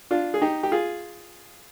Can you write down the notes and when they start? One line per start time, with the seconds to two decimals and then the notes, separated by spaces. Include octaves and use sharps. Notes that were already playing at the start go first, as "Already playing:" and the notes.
0.11 D4 F4
0.34 G#4
0.41 D#4 G4
0.63 G4
0.72 F4 G#4